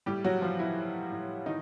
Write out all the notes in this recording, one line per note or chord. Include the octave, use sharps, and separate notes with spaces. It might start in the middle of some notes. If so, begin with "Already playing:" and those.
A2 G3 G4
F#3 F#4
E3 F3 F4
E3 E4
E3
A2
D#3 E3 D#4